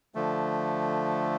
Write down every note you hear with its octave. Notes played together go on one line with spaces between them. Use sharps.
D3 F3 A3